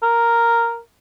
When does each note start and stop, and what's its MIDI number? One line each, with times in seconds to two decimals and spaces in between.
0.03 0.78 70